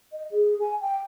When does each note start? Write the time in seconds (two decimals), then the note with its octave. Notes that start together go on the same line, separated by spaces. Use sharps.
0.12 D#5
0.30 G#4
0.60 G#5
0.80 G5